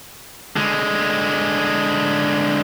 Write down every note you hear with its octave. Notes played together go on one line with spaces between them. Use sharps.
D3 G#3